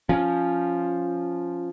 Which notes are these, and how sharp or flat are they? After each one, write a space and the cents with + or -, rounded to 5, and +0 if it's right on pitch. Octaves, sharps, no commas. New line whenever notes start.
F3 +0 C#4 +0